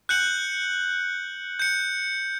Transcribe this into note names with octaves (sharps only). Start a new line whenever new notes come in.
F#6 G6 C#7 F#7
G6 C#7